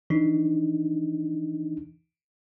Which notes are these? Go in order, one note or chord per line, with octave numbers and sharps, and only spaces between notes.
E3 D4 D#4